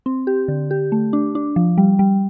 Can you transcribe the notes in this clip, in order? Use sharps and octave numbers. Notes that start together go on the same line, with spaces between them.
C4
G4
D3
G4
A3
D4
D4
F3
G3
G3